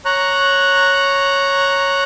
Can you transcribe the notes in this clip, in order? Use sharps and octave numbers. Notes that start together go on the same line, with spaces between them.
C#5 A#5 F#6